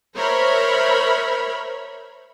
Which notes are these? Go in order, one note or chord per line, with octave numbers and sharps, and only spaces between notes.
A#4 C5 C#5 E5 B5